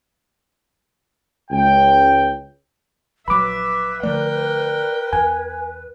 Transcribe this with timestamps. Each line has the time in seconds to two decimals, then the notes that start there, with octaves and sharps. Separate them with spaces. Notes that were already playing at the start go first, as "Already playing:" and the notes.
1.51 C#2 G5
3.28 A#1 F#3 B4 E5 B5 D6
4.03 D3 F3 A3 A#4 D5 G5
5.13 E2 G#5